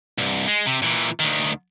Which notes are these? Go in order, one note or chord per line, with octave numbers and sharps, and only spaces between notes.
C2 G2
G#3
C3
A#2 E3
D2 D#3